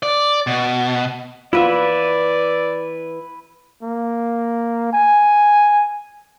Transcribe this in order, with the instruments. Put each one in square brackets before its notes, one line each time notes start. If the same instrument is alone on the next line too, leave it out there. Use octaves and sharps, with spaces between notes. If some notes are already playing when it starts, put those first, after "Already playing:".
[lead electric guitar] D5
B2
[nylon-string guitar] E3 B3 [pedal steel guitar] E4 B4 E5 [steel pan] F4 [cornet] D5
[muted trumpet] A#3
G#5